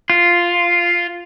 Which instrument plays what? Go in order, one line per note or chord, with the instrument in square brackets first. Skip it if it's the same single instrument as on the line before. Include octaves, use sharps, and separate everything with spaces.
[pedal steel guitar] F4